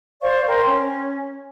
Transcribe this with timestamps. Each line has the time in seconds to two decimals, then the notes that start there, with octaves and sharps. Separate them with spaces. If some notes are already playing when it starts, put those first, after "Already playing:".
0.22 C5 D5 F5 C#6
0.48 A#4 G5 C6
0.66 C#4